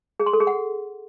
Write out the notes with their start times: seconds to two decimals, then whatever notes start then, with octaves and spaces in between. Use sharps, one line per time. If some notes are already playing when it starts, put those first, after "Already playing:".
0.20 G#4
0.26 C6
0.33 A4
0.40 G#4
0.47 F#5